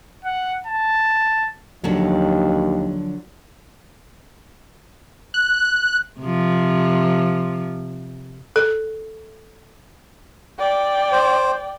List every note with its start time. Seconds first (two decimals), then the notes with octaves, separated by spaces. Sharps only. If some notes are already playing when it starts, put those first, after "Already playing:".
0.25 F#5
0.66 A5
1.84 D#2 D3 F3 F#3
5.34 F#6
6.20 C3 F3
8.56 A4
10.59 D5 G5
11.12 C5